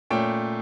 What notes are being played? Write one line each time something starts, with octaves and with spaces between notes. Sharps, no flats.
A#2 A3 C#4 G5